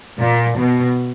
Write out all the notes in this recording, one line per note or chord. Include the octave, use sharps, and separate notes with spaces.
A#2
B2